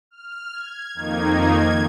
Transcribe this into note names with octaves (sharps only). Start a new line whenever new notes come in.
F6
G#6
F2 D#3 A#3 D#4 G#6
G#6